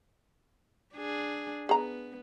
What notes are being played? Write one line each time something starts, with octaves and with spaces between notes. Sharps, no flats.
D4 G#4
B3 G#4 A#5